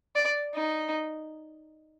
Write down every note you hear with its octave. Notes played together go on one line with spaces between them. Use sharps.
D5
D#4